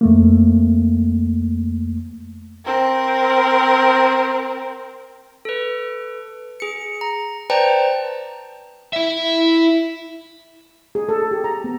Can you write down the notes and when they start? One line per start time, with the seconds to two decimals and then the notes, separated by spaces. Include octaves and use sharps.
0.01 F2 A3 A#3
2.65 C4 A#4
5.45 A4 B4
6.60 G#4 C#7
7.01 A#5
7.50 B4 C5 D5 G5 A5 A#5
8.93 E4 E5
10.95 G#4
11.09 A4
11.31 G4
11.44 A#5
11.64 B3